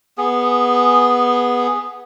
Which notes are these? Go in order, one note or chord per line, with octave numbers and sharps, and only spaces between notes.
B3 G#4